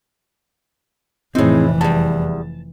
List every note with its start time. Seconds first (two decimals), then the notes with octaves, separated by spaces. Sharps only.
1.35 F1 A2 E3 C4 D#4 E4 G#4
1.81 E2 G3 A5